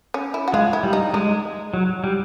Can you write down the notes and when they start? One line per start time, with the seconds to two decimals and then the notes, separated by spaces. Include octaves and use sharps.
0.14 C#4
0.34 E4
0.48 F#4
0.53 G#3 F4
0.73 E4
0.83 G3
0.93 D#4
1.13 G#3 D#4
1.74 F#3
2.04 G3